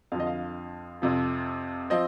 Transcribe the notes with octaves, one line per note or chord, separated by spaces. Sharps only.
F2 D3 F3 F5
D#5
F5
F2 C3 F3
F3 C4 D#5